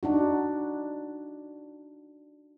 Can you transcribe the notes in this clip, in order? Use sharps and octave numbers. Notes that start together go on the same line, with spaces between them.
D4 D#4 F#4